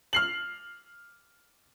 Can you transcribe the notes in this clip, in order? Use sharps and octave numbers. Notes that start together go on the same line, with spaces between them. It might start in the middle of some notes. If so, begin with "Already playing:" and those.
F6 C7 F#7